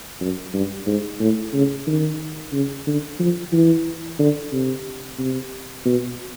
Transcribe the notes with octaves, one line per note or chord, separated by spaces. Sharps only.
F#2
G2
G#2
A2
C#3
D#3
C#3
D3
F3
E3
D3
C3
C3
B2